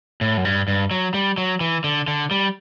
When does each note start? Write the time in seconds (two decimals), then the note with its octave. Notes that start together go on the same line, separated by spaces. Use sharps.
0.21 A2
0.37 F#2
0.45 G2
0.68 G2
0.91 F#3
1.14 G3
1.38 F#3
1.61 E3
1.84 D3
2.08 D3
2.31 G3